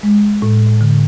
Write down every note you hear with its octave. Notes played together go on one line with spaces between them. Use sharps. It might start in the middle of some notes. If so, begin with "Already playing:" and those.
G#3
A2
D3